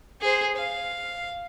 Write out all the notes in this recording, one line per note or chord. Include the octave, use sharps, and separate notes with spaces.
G#4 C5
F5